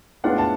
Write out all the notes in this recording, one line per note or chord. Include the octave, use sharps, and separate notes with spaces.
A2 G#3 B3 D4 F4 F#5
A5